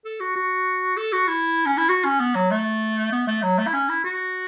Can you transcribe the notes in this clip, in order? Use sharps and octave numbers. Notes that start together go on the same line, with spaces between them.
A4
F#4
F#4
A4
F#4
E4
C#4
E4
F#4
C#4
B3
F#3
A3
B3
A3
F#3
A3
E4
C#4
E4
F#4